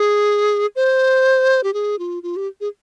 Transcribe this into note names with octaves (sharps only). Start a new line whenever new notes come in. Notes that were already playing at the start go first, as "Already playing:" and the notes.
Already playing: G#4
C5
G4
G#4
F4
F4
G4
G#4